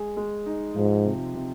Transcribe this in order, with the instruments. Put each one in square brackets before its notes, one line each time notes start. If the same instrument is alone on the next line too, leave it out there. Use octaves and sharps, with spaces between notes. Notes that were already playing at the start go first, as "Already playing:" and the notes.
Already playing: [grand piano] G#3 G#4
G#3
D#4
[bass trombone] G#2 [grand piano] F3
[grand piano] C3
C3